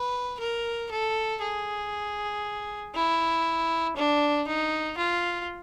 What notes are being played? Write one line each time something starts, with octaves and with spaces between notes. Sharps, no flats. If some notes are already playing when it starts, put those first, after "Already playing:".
Already playing: B4
A#4
A4
G#4
E4
D4
D#4
F4